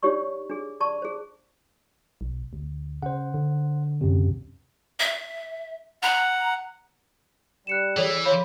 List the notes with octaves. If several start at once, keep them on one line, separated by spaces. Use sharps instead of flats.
D4 D#4 G4 C#5 D5 C#6
D4 G#4
G#4 D5 A5 C#6
G#4 C5
B1
D2
C#3 C5 F#5
D3
C#2 F#2 C3
E5
F#5 A#5
G3 F#6 C#7 E7
E3 G#4 A4 C#5 D5
C#5 F5 B5 C6